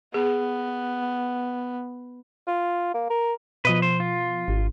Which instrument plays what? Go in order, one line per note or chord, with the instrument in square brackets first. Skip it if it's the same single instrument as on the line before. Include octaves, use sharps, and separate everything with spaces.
[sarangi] B3 [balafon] G#4
[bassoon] F4
A#3
A#4
[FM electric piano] B2 F3 [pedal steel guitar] B4 D#5
[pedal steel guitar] C5
F4
[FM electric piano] G#1